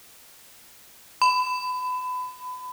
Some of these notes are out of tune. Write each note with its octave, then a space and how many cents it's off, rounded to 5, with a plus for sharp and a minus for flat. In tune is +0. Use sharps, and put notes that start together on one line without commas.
B5 +30